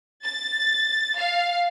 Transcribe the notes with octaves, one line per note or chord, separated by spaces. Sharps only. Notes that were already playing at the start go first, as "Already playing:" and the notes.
A6
F5